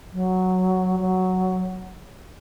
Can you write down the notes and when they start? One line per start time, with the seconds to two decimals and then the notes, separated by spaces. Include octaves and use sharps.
0.13 F#3
0.99 F#3